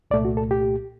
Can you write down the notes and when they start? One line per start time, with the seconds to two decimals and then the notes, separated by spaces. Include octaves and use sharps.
0.11 C2 A#2 A3 D5
0.25 F#4
0.37 A4
0.51 G4